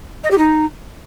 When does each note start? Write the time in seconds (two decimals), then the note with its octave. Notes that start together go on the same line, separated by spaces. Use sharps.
0.24 D#5
0.31 G4
0.38 D#4